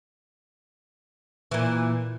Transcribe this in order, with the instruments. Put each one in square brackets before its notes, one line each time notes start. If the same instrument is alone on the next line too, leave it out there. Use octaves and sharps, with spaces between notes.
[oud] A#2 E3